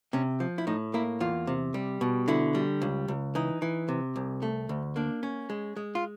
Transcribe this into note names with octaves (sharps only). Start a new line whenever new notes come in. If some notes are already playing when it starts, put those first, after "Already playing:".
C3 C#4
F3
E4
A2 D#4
A#3 E4
E2 F4
C3
G3
B2
D3 E4
G3
C#2
C#2
E3 D#4
E3
C3
C2
A3
D2
A#3 D4
C#4
G#3
G#3
F4